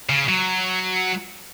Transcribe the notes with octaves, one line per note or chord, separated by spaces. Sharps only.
C#3
F#3